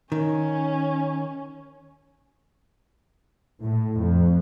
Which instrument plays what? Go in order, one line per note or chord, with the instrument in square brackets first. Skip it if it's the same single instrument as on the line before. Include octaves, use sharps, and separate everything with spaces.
[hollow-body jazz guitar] D#3 [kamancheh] C#4
[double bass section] A2
F2